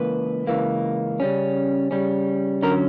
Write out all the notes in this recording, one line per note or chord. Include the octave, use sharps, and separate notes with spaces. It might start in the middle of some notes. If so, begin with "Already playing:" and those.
Already playing: C#2 E3 A#3 B4
C#2 C#3 E3 A#3
C#3 G3 C#4
C#3 G3 C#4
D3 F#3 C#4 A#4